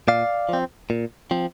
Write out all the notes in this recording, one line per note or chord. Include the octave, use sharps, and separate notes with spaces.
A#2 D5 F5
F3 C4
A#2
F3 C4